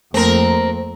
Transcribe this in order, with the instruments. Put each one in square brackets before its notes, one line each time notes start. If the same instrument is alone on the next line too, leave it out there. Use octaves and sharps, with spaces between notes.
[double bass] F2 [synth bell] A3 A#3 [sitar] C4 A#4